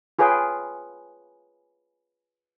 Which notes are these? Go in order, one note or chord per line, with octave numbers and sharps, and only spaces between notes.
F4 G#4 B4 C#5 G5